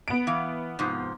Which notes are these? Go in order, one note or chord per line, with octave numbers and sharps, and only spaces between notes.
B3 D7
E3 F5
G#2 C3 F3